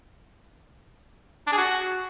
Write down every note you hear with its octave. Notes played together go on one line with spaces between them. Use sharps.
D4
G#4
F#4